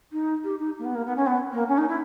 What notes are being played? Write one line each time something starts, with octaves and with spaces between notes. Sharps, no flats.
D#4
G4
D#4
A#3
B3
A#3
B3
C#4
B3
A#3
C#4
D#4
E4